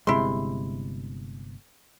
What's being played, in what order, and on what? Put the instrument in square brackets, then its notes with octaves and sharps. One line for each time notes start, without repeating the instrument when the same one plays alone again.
[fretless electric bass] G1 C3 G#3 [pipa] E4 C6